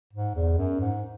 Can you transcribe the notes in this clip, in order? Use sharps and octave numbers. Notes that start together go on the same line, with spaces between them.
G#2
E2
F#2
G#2